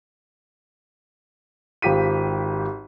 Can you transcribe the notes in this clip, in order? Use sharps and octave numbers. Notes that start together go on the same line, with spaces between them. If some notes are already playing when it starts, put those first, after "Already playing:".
G#1 F4 G4 B6 D#7